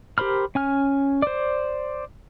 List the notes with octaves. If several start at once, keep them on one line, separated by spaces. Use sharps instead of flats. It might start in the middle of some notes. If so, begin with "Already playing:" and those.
G4 A#4 C5 B5 F6
C#4 G#5 F6
C5 D5